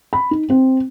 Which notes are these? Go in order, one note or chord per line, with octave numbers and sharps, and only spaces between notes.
B5
D#4
C4